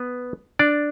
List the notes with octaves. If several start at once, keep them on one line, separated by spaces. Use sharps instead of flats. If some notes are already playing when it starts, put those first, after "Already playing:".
Already playing: B3 B4
D4 D5